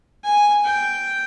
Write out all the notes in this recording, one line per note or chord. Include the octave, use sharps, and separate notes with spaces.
G#5
G5